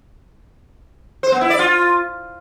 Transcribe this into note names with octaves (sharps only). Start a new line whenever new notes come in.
C5
B3
E4
D5
F4